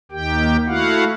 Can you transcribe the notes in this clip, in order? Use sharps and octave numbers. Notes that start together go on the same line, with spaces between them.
D#2 D#3 G4 G5
A3 E4 F#4 F5 F#5